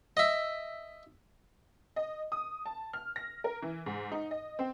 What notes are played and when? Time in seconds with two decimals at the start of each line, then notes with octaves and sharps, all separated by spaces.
0.17 D#5 E5
1.96 D#5
2.32 D#6
2.66 A5
2.93 F6
3.16 A#6
3.44 A#4
3.62 E3
3.86 G#2
4.12 D#4
4.31 D#5
4.59 C4